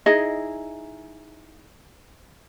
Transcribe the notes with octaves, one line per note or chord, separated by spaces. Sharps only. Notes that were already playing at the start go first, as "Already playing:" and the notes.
D#4 E4 G#4 D#5